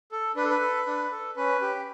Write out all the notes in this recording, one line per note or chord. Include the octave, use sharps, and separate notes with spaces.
A4
D4 B4
A4
B4
A4
D4
A4
C#4 B4
G4